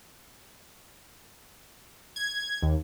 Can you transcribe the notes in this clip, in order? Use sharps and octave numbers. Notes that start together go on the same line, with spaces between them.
G#6
D#2